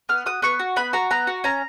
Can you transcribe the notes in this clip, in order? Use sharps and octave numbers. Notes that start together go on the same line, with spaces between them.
B3 F6
F#4 D#6
B3 C#6
F#4
B3 B5
F#4 A#5
B3 A#5
F#4
C#4 A#5